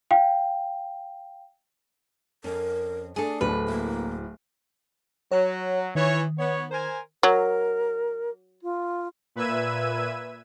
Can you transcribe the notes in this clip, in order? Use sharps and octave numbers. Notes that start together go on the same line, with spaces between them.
F5 G5
F2 C#4 A#4
A3 D4 G#4 A4
D1 B4
A#3 E4
F#3 C#5
D#3 E3 C#5
B3 C#5
A#4 C5 G#5
F#3 A#4
F4
A#2 B4 E5 E6 G#6 D#7